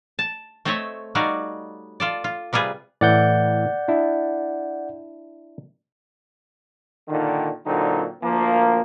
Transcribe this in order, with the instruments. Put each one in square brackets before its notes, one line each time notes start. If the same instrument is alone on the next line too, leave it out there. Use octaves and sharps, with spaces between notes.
[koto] A5
A3 C4 A4 C#5 D#5 E5
G3 D#4 F#4 C#5 D5 F5
F4 A4 D5
F4
C3 G3 F4 G#4 B4
[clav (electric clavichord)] A2 E3 [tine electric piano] D5 F#5 G6
[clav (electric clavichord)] D4 E4
[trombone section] A#2 D3 D#3
A#2 D3 F#3 C4 D#4
D2 F3 A#3